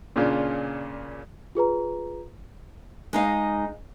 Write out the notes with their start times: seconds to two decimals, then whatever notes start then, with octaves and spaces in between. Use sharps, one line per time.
0.16 A#2 C#3 C#4 D4 F4
1.55 F4 G#4 B4 A#5
3.13 G#3 D#4 F5